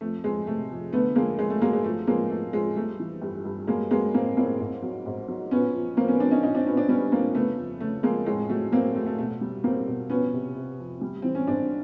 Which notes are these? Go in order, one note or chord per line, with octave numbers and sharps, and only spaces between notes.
F2 A3
F2 G#3
C3 A3
F2
D3 A3 B3
F2 G#3 A#3
F2 G#3
A3
F#3 G#3 A#3
G#3
F3 A3
F3 G#3 A#3
F3 A3
F3 G#3
G3 A3
E3
G2
G2
F#3 G#3 A#3
F#3 G#3 A#3
A2 A#3 C4
A2 A#3 C4
G#2
F#3
G#2
F#3
A#2 B3 C#4
F3
F3 A#3 C4
B3 C#4
F3 C4 D4
C#4 D#4
A#2 C#4 D#4
C4 D4
A#2 B3 C#4
C4 D4
G3 B3 C#4
A#2 A#3 C4
C#3 A3 B3
F2
C#3 A3
F2 G#3 A#3
A2 G#3
F#3 A3
F#3 A#3 C4
F#3 A3
A3
B2 A3
G3
G3 A#3 C4
B2
F3 B3 C#4
C3
C3
F2
G3
E3 C4
C#4
G#2 C4 D4